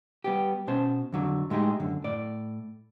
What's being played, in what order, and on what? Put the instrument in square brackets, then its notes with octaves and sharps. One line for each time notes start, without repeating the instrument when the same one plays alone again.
[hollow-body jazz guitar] G3 B3 G4
B2 C#4 C5 A5
F2 D3 F#3
A2 G#3 D#4 G4 G#4
F#2 D3
A2 D5